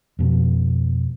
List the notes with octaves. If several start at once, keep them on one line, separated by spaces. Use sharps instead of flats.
F2 B2